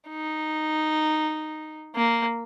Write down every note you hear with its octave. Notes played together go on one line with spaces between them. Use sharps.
D#4
A#3